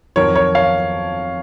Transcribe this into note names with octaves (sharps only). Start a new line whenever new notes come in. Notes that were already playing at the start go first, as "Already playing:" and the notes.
F2 D#3 F#3 A#4 C#5
A#4 C#5
C#5 F5